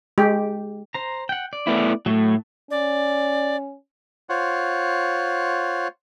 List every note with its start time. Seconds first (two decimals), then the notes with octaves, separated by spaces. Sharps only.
0.18 G#3 G4
0.94 C5 A#5
1.29 F#5 G5
1.53 D5
1.67 A3 B3 E4
2.06 A2 F#3 A3
2.71 C#4 D5
4.29 F4 C5 C#5 F#5